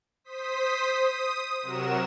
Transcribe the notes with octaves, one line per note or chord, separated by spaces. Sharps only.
C5 D#6 B6
D#6
C3 F#3 F#4 A#4 E7